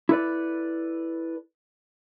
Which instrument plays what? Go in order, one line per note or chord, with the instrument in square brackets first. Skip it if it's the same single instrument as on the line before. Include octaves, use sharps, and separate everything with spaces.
[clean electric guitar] E4 A4 B4 D5